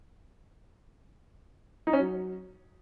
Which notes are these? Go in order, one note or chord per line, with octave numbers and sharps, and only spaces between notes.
D#4
C#4
F#3